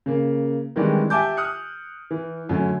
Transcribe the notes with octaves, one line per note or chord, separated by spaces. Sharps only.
C#3 A#3
D#3 E3 G3 G#3 C4 D4
G4 E5 G#5 A5 D6 G6
D#6 F6 F#6 C#7
E3
F#2 D3 A3 C#4